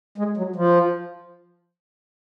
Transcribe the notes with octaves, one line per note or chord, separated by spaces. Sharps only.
G#3
F#3
F3